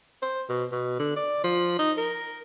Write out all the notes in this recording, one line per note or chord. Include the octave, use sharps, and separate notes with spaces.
C5
B2
B2
D3
D5
F3
D#4
A#4